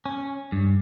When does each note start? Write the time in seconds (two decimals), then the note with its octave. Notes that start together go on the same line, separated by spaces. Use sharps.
0.06 C#4
0.52 G2